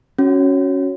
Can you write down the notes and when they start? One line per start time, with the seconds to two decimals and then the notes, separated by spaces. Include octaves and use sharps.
0.18 C#4 F#4